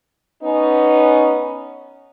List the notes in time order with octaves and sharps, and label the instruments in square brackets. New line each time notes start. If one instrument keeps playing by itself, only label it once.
[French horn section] B3 C#4 D#4